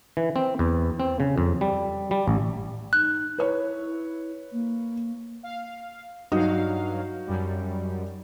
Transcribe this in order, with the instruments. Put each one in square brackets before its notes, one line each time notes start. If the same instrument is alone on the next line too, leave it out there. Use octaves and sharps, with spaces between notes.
[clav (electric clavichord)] E3
C4
E2
C4
C#3
F2
G3
G3
A1
[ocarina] D#4 [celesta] F#6
[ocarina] E4 [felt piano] B4 C#5
[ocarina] A#3
[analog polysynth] F5
[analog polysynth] G2 F#3 F5 [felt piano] D#4 F#4 D#6
[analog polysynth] F#2 G3